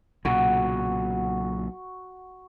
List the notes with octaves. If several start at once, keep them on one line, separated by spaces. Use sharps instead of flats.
B1 A#2 C#3 F#4